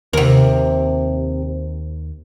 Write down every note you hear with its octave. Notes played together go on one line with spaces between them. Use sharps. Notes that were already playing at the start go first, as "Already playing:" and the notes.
D#2 C3 A#4